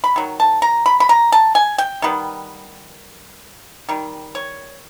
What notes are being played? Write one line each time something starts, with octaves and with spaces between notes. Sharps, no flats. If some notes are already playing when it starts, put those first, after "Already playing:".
B5
D#3 F#3
A5
A#5
B5
B5
A#5
A5
G#5
G5
D#3 G3 B3
D#3 G3
C#5